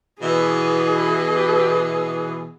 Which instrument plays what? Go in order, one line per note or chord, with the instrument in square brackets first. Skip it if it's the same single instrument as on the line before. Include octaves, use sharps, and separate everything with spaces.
[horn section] B2 E3 [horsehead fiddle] G#4